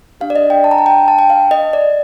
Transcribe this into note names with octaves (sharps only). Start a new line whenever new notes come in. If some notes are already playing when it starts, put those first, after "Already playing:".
D4 G4 F5
D5
D#5
G5
A5
A#5
A5
G5
A5
G5
F5
D#5
D5